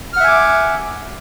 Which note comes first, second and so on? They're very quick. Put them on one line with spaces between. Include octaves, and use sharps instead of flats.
F6 F#5 E5 G#5 D6